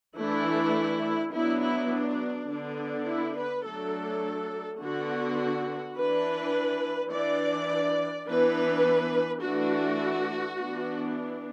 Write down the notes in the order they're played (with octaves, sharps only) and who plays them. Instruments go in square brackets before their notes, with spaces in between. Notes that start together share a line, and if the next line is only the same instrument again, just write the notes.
[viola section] E3 A3 D4 E4
F#3 B3 D4 E4
E4
D4
D3 B3 D4
E4
B4
F#3 A3 D4 A4
D3 B3 D4 F#4
E3 D4 B4
E3 D4 D5
E3 B3 D4 B4
E3 A3 D4 F#4
E3 B3 D4